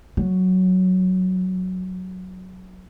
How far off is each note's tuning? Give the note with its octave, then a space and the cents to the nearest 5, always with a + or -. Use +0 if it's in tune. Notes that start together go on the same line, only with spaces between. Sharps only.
F#3 +0